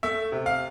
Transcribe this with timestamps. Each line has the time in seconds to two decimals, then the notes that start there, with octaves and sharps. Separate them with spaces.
0.03 A3 E5
0.32 C3
0.46 F5